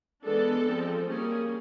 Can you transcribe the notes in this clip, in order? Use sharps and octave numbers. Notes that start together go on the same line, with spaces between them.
E3 G#3 B3 D4 A4
F3 G#3 C4
G3 A#3 C#4 G#4